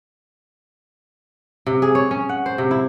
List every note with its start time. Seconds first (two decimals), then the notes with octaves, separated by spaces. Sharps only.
1.66 C3
1.82 G#4
1.95 C#5
2.11 C#4
2.29 F#5
2.46 C5
2.58 C3
2.71 E4